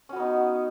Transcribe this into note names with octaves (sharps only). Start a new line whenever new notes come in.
B3 C#4 D#4 F#4